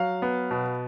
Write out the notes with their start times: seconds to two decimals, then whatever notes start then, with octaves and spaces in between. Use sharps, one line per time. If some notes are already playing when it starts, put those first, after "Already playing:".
Already playing: F#3 F5
0.22 B3
0.51 B2